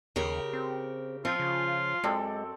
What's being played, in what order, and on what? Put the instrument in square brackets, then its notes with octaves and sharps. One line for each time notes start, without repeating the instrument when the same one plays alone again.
[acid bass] D#2 [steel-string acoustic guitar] C#3 G4 A#4
[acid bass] C4
[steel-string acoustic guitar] F3 [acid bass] C4 [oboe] F4
[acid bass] C#3
[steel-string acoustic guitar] F#2 [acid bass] G#3 [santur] C4 A4 D5